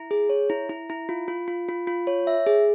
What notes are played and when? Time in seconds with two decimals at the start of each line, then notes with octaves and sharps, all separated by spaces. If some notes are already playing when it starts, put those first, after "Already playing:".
Already playing: E4
0.11 G#4
0.29 C#5
0.50 E4
0.69 E4
0.90 E4
1.09 F4
1.28 F4
1.48 F4
1.69 F4
1.87 F4
2.07 C#5
2.27 E5
2.47 G#4